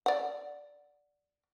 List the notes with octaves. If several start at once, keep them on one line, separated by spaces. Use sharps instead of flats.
D5 F#5